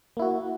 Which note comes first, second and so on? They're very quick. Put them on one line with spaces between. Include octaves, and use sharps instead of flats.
A#3 E4 F#4